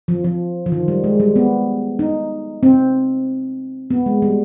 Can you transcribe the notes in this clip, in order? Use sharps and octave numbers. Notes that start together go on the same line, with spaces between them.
F3
F3
F3
D#3
G3
G#3
G3
B3
D#4
C4
B3
G#3
G3